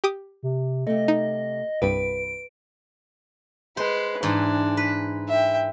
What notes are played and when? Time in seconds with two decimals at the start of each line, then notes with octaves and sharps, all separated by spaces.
0.04 G4 D6 D#6
0.43 C3
0.87 C3 A3 D#5
1.08 D#4
1.82 C2 G2 B4 D7
3.77 G#3 B4 C5
4.23 G#2 E3 D4
4.77 B4
5.29 E5 G5